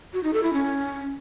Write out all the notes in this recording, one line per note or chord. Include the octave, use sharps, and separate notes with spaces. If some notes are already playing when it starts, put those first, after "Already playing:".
F#4
D#4
A4
E4
C#4